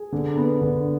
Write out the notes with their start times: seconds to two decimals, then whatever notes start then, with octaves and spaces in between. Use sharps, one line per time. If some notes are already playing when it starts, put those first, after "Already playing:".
Already playing: G#4
0.12 D3
0.37 B3
0.62 D3